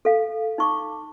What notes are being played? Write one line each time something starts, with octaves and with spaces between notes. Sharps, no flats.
A4 F5
D#4 C#6 D6